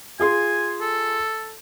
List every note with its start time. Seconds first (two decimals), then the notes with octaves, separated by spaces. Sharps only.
0.20 F4 G#4 G#5 C6
0.81 A4